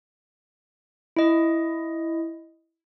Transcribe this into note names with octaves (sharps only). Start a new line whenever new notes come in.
E4 D#5